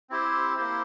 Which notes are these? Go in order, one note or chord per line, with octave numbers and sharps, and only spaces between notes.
C4 E4 G4 C5
A#3 E4 G4 C5